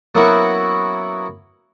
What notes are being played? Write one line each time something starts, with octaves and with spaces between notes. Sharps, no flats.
F#3 A#3 B3 C#4 E4 F#4